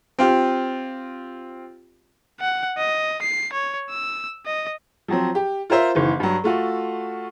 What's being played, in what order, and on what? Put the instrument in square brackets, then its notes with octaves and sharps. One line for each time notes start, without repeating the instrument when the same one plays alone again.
[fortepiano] C4 F4 G4
[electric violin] F#5
D#5
C7
C#5
E6
D#5
[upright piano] F3 F#3 C4
G4
F4 A#4 C5 E5
F#1 D#3 E3
G2 F#3
A3 F4 F#4 A4